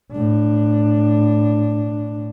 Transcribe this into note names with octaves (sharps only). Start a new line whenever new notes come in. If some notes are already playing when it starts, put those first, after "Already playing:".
A2 D4